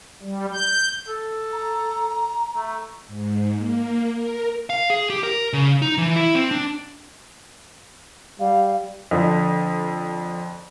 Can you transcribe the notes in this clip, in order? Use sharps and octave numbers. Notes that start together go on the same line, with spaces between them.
G3
G6
A4
A#5
A3
G#2
A#3
A#4
F5
G#4
G4
A#4
C#3
D#4
E3
E4
C4
D4
G3 F5
F2 D3